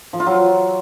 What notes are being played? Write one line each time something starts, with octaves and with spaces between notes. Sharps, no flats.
F3
F4
F#3